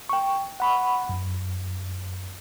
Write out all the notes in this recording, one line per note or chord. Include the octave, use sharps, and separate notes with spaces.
G5 C#6
F#5 B5 C#6
F#2